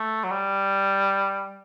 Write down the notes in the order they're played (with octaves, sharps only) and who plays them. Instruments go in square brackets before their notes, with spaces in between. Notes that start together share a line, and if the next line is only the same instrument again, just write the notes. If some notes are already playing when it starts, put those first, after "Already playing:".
Already playing: [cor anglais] A3
F#3
G3